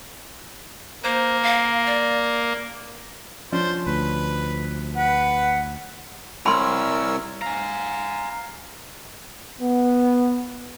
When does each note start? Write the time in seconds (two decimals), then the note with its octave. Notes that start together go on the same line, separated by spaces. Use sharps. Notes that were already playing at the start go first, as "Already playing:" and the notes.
1.04 A#3 C5
1.43 F5
1.86 D5
3.52 F3 C#4 D4 C5
3.87 D2 B4
4.95 B4 F#5
6.46 C2 C#4 A#4 B5 C6 E6
7.42 F5 G#5 A#5
9.61 B3